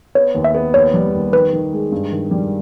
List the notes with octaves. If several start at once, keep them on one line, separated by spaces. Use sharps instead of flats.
B3 C#5
D#2
E5
B3
D#2 C#5
G3
D#2
D#3 B4
D#3
G#3
G2
D#3
G3